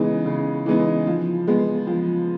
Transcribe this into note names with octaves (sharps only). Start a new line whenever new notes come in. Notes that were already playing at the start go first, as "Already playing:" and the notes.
Already playing: C#3 E3 G#3 B3 D#4
C#3
E3 G#3 B3 D#4
F3
G#3 B3
F3